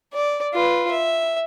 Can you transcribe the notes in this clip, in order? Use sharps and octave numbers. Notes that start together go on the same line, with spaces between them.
D5
F4 B4
E5